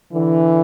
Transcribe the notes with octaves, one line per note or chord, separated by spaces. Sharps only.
D3 E3